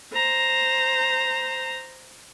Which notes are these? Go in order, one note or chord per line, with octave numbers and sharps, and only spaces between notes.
C5 A#5